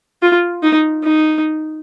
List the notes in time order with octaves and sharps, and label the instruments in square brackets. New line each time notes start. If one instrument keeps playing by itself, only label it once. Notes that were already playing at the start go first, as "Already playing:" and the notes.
[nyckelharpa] F4
D#4
D#4